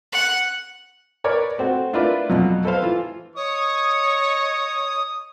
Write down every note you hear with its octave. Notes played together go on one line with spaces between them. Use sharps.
F#5
A#4 B4 C#5 D5
A3 C4 F#4
D4 E4 F4 A#4 B4 D5
F2 B2 F#3
A4 B4 C5 F5
E3 F4
C#5 D#5 C#6 D#6